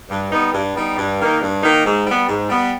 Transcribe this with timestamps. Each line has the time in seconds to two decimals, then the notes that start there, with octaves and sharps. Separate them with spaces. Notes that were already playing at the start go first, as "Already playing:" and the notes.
0.09 G2
0.31 G3 B3 D#4
0.53 G2
0.75 G3 B3 D#4
0.97 G2
1.19 D#3 A#3 D#4
1.41 G2
1.63 D#3 A#3 D#4
1.84 G#2
2.06 G3 B3
2.28 G#2
2.50 G3 B3